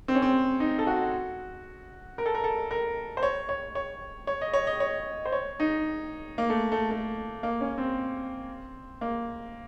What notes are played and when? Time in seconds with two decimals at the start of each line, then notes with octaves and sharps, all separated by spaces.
0.08 C4
0.15 C#4
0.22 C4
0.60 D#4
0.79 A4
0.87 F#4
2.18 A#4
2.26 A4
2.35 A#4
2.44 A4
2.71 A#4
3.17 C5
3.23 C#5
3.49 C#5
3.75 C#5
4.27 C#5
4.41 D#5
4.53 C#5
4.67 D#5
4.80 C#5
5.26 C5
5.32 C#5
5.60 D#4
6.38 A#3
6.50 A3
6.72 A3
6.91 A3
7.43 A#3
7.61 C#4
7.78 C4
9.01 A#3